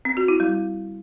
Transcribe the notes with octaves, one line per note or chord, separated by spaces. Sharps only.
C4
F#4
E4
G3